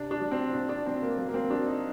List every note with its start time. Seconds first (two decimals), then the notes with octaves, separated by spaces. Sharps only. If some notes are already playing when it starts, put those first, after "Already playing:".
Already playing: C3 D4
0.11 D4
0.21 F#3
0.31 C4
0.54 A#2 D4
0.69 D4
0.86 F#3 C4
1.02 A#3
1.18 F#3 A#3
1.28 A#3
1.34 C4
1.50 F#3 D4
1.67 D#4